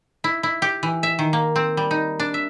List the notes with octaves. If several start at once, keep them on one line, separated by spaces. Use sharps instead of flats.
E4
E4
G4
E3
E5
D#3
A#3
C4
G3
D#4
D4
E5